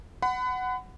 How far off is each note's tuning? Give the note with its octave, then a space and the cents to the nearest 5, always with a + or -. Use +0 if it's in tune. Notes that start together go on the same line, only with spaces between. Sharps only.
F#5 +5 B5 +35